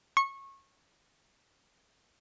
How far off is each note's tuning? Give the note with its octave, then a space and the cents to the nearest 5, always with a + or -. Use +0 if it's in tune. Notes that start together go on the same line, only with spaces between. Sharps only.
C#6 -20